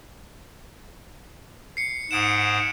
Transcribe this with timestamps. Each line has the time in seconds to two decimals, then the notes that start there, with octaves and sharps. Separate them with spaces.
1.77 C7 C#7
2.11 G#2 F#5 D#6 D7 E7